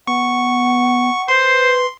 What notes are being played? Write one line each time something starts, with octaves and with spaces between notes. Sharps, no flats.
B3 F#5 C#6
B4 C5 C6